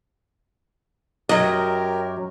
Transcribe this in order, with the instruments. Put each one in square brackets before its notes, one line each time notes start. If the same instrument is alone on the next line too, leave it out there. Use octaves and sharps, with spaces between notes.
[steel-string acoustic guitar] F#2 F#3 [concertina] G4 A#4 [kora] D#5